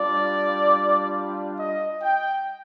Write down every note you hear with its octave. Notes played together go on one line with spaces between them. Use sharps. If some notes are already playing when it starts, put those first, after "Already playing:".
Already playing: G3 D4 F4 D5
D#5
G5